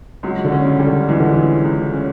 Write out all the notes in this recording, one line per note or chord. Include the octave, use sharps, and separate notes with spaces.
C#2 F#3
D3
C#4
C#3
G3
D3
C#2 E3
D3
C#3 E3
C#2
C#4